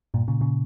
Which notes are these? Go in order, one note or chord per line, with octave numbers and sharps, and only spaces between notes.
G2 A#2
A#2 C#3
A#2 C#3